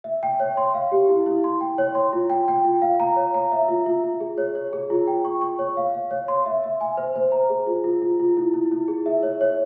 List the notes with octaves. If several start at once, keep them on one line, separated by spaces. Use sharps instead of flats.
E5
G5
C#5
C6
F5
G4
E4
E4
C6
G5
C#5
C6
F4
G5
G5
F4
F5
A#5
C#5
A#5
E5
F4
F4
F4
G#4
C#5
C#5
G#4
F4
G5
C#6
C#6
C#5
F5
F5
C#5
C6
E5
E5
G#5
C5
C5
A#5
G#4
F4
F4
F4
F4
E4
E4
E4
G#4
E5
C#5
C#5